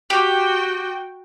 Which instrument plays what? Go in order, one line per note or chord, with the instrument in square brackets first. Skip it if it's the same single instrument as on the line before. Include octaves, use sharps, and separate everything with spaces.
[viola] F#4 G5 [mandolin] G4